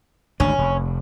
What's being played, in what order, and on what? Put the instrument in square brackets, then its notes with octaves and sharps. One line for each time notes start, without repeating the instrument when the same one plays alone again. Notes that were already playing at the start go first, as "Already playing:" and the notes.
[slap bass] G#1 D2 D4 [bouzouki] C#4
[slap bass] F1